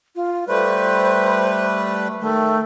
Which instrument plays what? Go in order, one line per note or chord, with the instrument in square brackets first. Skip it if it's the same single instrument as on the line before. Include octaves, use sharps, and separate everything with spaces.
[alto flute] F4
[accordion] G3 A3 B4 [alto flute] C5
[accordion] D#3 [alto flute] A3